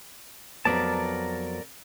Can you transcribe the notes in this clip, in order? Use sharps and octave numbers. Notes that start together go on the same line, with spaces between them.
F2 F#3 B3 A#4 D5 A5